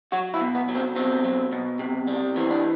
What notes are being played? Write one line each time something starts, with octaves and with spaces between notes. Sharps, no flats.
F#3 F#4
E4
B2
B3
F#3
C4
B2 C4
F#3
B2
C3
G3
E3 C4
D4